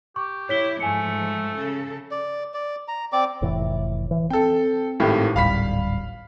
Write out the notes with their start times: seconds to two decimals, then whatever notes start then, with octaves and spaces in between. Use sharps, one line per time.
0.16 G4 C#6
0.49 E4 C#5 B6 G7
0.80 G#2 F3 A3 G#5 C#7
1.56 C#3 A4
2.11 D5
2.54 D5
2.88 A#5
3.13 C4 D5 D6
3.42 F1 A2 E3
4.11 E3
4.30 C4 A4 G5
5.00 G#1 A2 G4
5.36 D1 G#1 G3 F5 B5 B6